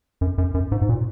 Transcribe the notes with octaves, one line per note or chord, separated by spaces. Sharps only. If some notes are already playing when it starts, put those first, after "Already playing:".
F#2
F#2
F#2
G#2
G#2
A#2